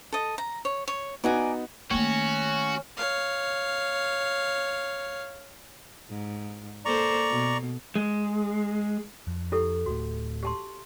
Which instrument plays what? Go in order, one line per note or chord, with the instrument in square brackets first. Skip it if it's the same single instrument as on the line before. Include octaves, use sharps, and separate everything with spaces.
[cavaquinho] A4 D#5
A#5
C#5
C#5
[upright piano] B3 D#4 F#4 [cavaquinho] D5 G#5 A#5
[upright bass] D#3 A3 [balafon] A#3 [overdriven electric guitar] C#4 [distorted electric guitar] F#4
[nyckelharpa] C#5 F5
[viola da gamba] G#2
[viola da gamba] A#3 A4 C5 [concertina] D5 A#5 C#6
[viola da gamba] B2
[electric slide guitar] G#3
[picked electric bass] F2
[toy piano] E4 G4 A4
[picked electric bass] D1 A2 [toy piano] F#4
[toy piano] G4 A5 C6